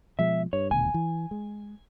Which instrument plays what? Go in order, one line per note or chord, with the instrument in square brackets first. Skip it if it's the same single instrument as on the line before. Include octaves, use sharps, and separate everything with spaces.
[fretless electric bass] B2 F3 G#3 [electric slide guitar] E5
[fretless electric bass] G2 [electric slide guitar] C#5
[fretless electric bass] D#1 D2 B2 [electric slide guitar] G#5
[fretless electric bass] E3
G#3